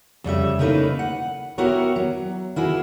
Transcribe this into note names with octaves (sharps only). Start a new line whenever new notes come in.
F2 C#3 G3 E5
C#3 A3 A#3 D#4 E4 B4
F#5
B3 E4 F#4 G4 A#4 C#5
F#3
A#3 E4 F#4 G#4